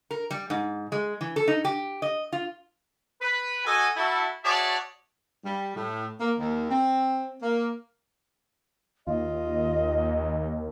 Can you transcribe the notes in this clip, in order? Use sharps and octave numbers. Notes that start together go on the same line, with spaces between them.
A#4
G3
G#2
G#3
E3
A4
D#4
G4
D#5
F4
B4
F#4 A4 D#5 G#5
E4 F#4 A4
F#4 G#4 C#5 D5 E5 A5
G3
A2
A#3
D#2
C4
A#3
D#2 F4 D#5